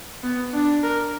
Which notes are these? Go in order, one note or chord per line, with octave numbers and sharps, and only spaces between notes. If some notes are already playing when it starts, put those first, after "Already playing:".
B3
D4
A#4